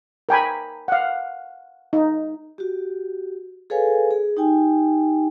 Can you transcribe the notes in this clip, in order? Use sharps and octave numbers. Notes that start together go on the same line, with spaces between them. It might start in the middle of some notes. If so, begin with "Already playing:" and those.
A#4 G5 G#5 B5
F5 F#5
D#4
F#4 G4
G#4 A4 B4 C#5 F5 G#5
G#4
D#4 G4 G5 G#5